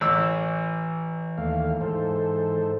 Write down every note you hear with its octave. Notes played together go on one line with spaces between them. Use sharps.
A1 E3 E6
D#2 A3 F5
G#2 A4 C5